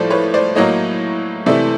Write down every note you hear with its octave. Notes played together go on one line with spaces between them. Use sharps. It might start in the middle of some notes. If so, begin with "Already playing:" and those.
Already playing: A2 F3 A3 C5 D5
B4 C#5
C5 D5
A2 F#3 A#3 C#5 D#5
C3 E3 A3 D5 E5